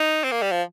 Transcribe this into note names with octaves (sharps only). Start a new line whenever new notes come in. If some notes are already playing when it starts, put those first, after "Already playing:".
Already playing: D#4
C4
A#3
G3
F3